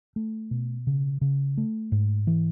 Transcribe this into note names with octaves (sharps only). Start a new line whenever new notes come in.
A3
B2
C#3
C#3
A3
G#2
E3